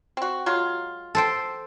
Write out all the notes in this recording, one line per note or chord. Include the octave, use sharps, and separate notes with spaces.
C4 F#4
F#3 G#3 F4
A4 C5 G5